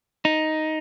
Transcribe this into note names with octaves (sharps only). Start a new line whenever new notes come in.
D#4